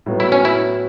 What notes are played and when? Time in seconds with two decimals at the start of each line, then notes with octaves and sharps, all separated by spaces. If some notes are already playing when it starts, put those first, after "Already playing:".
0.06 A2 F#3 B3
0.20 E4
0.32 C#4
0.45 E4